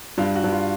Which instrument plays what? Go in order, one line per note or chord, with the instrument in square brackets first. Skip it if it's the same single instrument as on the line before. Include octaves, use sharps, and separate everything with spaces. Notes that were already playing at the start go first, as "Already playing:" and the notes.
[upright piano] G2 [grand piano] F4
[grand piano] F#4
[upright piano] G2
[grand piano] F4